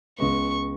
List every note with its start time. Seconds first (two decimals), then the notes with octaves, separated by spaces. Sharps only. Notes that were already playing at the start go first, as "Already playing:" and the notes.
0.18 C#2 C#3 G#3 B3 C#6